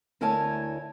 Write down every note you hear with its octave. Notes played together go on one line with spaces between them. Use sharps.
D2 E4 A#4 C#5 G#5 A5